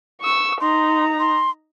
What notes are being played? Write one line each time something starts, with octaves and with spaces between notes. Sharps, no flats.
C#6 E6
D#4 A#5 C6
C6